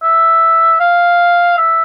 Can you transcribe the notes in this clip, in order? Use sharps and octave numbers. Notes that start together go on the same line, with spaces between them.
E5
F5
E5